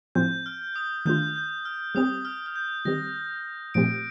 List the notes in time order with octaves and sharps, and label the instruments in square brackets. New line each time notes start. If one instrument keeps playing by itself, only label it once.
[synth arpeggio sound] A2 F3 C4 [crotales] G6
[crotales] F6
D#6
[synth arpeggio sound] D#3 A3 D4 F4 [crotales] G6
[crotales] G6
F6
[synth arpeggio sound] G3 C4 G4 [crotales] D#6
[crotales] F6
F6
G6
[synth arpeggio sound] D#3 G3 C4 G4 [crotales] A#6
[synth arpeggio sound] A#2 F3 A3 C4 G4 [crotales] D7